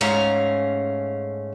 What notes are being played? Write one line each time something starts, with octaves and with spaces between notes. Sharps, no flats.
G#2 A3 C#4 F5 A#5